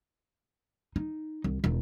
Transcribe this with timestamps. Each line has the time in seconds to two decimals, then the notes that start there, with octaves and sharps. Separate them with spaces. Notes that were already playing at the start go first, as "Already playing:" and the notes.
0.96 D#4
1.44 C2
1.64 E1